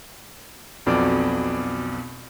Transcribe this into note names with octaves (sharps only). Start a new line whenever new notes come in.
B1 F2 B2 D5 D6